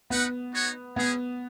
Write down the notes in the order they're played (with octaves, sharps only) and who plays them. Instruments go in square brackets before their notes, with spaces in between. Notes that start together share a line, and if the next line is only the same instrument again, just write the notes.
[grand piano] B3 [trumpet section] D#4 B4 F#5
[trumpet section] B3 D#4 F#4 C#5
[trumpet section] G#3 C#4 G#4 [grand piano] B3